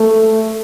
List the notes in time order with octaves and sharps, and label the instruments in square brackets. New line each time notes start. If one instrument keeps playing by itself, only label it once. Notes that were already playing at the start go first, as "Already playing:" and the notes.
Already playing: [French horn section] A3